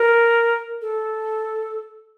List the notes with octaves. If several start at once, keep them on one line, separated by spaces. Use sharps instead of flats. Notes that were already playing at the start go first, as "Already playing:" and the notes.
Already playing: A#4
A4